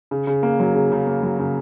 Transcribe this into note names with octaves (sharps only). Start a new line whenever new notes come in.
C#3
C#3
A#3
F#3
C#3
C#3
A#3
F#3
C#3